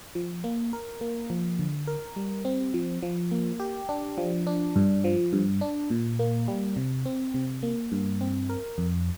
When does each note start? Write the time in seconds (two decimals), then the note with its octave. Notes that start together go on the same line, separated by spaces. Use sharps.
0.15 F3
0.44 A#3
0.73 A#4
1.01 A#3
1.30 F3
1.59 D3
1.87 A#4
2.16 G3
2.45 C4
2.74 F3
3.03 F3
3.31 A#3
3.60 G4
3.89 D4
4.18 F3
4.47 D4
4.76 G2
5.04 F3
5.33 G2
5.61 D4
5.90 A#2
6.19 A#3
6.48 G3
6.76 C3
7.06 C4
7.34 C3
7.63 A#3
7.92 G2
8.21 C4
8.49 A#4
8.78 F2